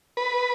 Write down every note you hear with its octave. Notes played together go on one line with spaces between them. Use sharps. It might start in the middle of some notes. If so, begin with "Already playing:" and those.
B4